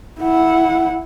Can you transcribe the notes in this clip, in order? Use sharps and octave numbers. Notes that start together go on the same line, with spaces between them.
E4 F#5